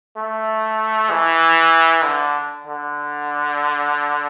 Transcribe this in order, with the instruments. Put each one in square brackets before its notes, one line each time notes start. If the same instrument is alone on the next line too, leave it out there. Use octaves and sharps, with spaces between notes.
[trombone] A3
E3
D3
D3